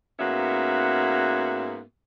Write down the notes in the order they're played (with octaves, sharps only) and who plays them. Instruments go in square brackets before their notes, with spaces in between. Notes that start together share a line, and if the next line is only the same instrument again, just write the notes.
[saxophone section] G#2 A#3 B3 C#4 F#4 E5